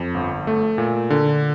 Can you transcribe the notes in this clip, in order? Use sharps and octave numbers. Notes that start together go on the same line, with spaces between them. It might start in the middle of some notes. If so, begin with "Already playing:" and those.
Already playing: F2
G1
A3
A#2
D3